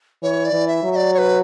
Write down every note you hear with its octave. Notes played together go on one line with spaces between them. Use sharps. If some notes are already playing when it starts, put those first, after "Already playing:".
E3 C#5
D5
E3
E5
F#3
E5
D5
C#5
B4